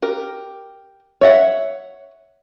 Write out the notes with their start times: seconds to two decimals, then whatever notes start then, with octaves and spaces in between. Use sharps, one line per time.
0.02 G4 A#4
1.21 C#5 E5 F#5